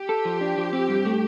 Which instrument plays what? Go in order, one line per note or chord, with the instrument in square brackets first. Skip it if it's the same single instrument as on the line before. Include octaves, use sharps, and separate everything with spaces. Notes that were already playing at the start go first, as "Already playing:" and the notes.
Already playing: [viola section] G4
[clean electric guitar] A4
F3
D4
F3
C4
G2
A3